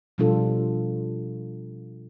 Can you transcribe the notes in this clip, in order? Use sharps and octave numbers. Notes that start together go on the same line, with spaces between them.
B2 F3 G3 D4 F4 A4